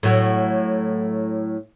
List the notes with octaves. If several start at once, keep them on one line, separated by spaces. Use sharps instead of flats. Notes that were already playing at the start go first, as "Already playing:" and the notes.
A2 F#3